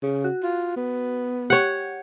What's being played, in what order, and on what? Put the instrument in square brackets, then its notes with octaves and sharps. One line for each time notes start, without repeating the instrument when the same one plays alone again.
[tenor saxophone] C#3
[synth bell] F#4
[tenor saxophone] F4
B3
[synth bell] G4 [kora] C#5 F#5